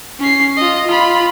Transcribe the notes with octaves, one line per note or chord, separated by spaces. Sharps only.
C#4 C7
F4 D#5
F4 B5